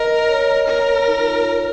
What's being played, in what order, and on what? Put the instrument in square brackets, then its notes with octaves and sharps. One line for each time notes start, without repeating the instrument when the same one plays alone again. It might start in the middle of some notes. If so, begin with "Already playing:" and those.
Already playing: [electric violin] A#4 [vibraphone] D#5
[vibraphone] C#5
[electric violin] A#4
[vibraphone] D#4
F4
D#4